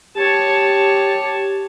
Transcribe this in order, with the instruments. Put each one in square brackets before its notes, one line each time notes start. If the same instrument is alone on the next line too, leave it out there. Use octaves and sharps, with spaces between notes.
[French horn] G4 [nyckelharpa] C#5 A5